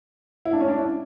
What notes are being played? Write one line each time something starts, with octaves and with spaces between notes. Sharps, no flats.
E4
D4
C#4
D4
E4